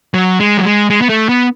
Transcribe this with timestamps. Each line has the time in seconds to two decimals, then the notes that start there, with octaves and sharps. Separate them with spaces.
0.14 F#3
0.40 G#3
0.57 F#3
0.64 G#3
0.90 G#3
1.01 B3
1.09 A3
1.29 B3